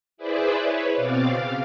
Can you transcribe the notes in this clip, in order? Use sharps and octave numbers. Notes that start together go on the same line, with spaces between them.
E4 G#4 B4 C5 D5 E5
B4 C#5
B2 C4 F5 D6 A6
C#3 F5